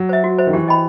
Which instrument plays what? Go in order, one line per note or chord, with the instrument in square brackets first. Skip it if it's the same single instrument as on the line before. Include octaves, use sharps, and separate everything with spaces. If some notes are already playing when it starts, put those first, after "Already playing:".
Already playing: [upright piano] F#3
[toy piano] C5 E5
F#4
C5 E5
[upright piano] D#3
[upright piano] E3 [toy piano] G4
[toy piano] D#5 G5 B5